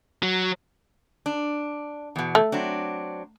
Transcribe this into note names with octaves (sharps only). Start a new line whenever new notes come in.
F#3
D4
E2 B2
A3
F#3 C4 D4